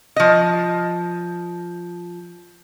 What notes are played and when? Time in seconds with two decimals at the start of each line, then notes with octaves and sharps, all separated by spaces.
0.16 F3 D#5